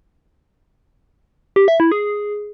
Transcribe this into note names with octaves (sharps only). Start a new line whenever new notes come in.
G4
E5
E4
G#4